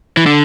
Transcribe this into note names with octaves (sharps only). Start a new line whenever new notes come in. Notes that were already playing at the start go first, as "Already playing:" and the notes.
E3
D3